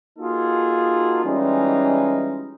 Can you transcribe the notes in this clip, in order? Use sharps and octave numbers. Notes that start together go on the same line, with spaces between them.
A#3 D#4 F4 F#4 G#4 A4
E3 G3 G#3 C#4 D#4 F4